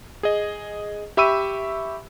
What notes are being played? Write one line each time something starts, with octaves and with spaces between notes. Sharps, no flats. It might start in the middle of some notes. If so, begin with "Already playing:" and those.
G#4 D#5
G4 E5 B5 C#6 E6 D#7